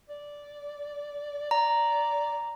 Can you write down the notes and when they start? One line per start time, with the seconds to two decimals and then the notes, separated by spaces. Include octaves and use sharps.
0.09 D5
1.51 D5 A#5